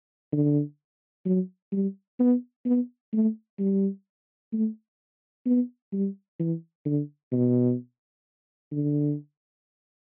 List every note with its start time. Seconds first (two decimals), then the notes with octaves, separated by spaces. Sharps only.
0.32 D3
1.26 F#3
1.72 G3
2.20 B3
2.65 B3
3.13 A3
3.59 G3
4.53 A3
5.46 B3
5.92 G3
6.39 E3
6.85 D3
7.32 B2
8.72 D3